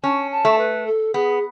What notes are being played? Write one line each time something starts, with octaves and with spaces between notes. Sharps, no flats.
C#4 A5
A5
A3
B4
A4
B3 G#4